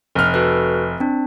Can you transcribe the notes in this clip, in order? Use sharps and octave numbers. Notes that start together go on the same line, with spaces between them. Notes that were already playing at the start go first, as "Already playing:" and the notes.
F1 F6
F#4 A4 B4
C4 D4